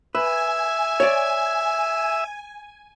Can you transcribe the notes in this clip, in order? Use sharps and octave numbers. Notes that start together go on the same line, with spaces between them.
B4 E5 G#5
C#5 D5